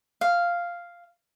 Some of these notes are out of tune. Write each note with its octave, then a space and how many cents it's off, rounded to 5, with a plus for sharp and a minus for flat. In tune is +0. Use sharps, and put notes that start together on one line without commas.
F5 -5